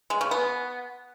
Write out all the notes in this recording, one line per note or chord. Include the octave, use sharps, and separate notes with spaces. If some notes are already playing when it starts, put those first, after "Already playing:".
G#3
C#3
B3